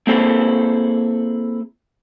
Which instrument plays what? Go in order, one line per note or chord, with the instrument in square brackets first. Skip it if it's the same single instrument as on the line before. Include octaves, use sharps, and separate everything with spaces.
[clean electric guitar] A#3 C4 E4 G#4 A4